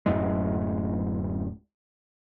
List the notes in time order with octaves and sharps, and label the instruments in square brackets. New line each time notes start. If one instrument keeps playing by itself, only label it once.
[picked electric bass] D1 F#2 A2 G#3